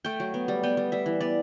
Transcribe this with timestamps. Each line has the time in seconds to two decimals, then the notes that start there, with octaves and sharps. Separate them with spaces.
0.05 A3 G5
0.20 F#3
0.34 B3
0.48 G3
0.63 B3 G5
0.77 G3
0.92 G3 E5
1.06 E3
1.21 B3 D5